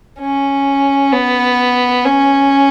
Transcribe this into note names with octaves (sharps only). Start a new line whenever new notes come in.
C#4
B3
C#4